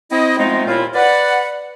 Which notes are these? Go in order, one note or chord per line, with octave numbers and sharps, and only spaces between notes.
C4 E4 D#5
F3 G#3 A3 B3 C4 D#4
D#2 A#2 E4 F4
B4 D5 F#5